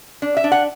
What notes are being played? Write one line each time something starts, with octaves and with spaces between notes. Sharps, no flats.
D4
E5
D4
F#5